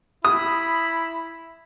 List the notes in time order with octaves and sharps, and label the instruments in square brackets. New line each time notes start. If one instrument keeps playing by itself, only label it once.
[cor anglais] E4 [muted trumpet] B5 [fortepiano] D#6